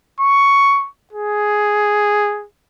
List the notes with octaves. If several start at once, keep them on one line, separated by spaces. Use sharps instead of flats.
C#6
G#4